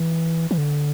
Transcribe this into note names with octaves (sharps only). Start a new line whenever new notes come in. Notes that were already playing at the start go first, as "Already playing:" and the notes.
Already playing: E3
E3
D3